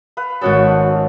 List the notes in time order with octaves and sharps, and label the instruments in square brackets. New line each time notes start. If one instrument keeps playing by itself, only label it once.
[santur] B4 F5
[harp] G#1 F#4 A4 [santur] B3 C#4 C#5